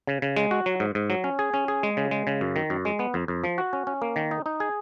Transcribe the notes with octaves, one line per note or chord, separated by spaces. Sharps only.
C#3
C#3
G#3
F#4
F#3
G#2
G#2
F#3
C#4
G#4
C#4
G#4
G#3
C#3
G#3
C#3
F#2
D#3
F#2
G#3
B3
F2
F2
F3
F#4
C#4
C#4
A#3
D#3
D#4
D#4
G#4